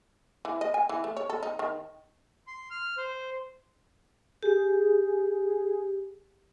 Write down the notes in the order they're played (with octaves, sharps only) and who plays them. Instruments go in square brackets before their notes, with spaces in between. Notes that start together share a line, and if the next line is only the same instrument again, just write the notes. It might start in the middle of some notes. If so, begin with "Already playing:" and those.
[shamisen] E3
D#5
G#5
E3
A3
C#5
A4
D#4
D#3
[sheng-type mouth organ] C6
F6
C5
[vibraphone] G4 [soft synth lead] G#4